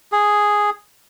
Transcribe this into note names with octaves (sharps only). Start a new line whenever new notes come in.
G#4